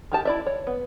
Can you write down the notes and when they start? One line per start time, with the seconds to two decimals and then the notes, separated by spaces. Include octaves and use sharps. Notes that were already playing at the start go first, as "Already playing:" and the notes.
0.12 D#3 G4 A5
0.25 E4 D5 E5
0.46 C#5
0.67 B3